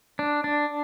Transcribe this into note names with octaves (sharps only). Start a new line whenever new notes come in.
D4
D4